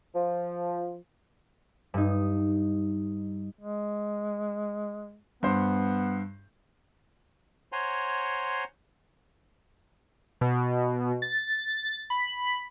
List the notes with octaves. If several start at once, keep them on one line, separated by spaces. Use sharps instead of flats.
F3
G2 D#4
G#3
G2 B3 C5
C5 C#5 F#5 G#5 A#5 C6
B2
A6
B5